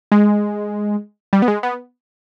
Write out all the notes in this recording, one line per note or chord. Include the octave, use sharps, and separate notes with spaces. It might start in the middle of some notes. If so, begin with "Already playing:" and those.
G#3
G3
B3
G#3
B3